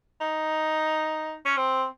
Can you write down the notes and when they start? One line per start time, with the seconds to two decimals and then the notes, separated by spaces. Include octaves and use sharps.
0.21 D#4
1.45 C#4
1.57 C4